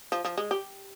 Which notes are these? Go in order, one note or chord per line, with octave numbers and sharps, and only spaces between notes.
F3
F3
G#3
G4